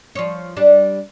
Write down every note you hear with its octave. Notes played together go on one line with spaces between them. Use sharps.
F3 C#5
G3 D4